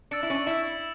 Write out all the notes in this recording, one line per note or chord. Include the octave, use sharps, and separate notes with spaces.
D4 E6 A6 C#7 E7
E4
C#4
D4
E4 E6 A6 C#7 E7